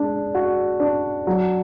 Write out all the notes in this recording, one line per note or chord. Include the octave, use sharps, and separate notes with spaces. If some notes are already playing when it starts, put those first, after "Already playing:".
Already playing: G#3 D4
F#4
D4
F#3